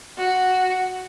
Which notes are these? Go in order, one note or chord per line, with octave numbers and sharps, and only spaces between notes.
F#4